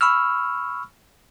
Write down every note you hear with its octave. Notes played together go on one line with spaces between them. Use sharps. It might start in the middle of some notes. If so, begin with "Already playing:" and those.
B5 C#6 E6 F6